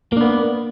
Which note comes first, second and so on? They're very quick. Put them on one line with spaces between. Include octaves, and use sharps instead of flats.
A#3 D4 B3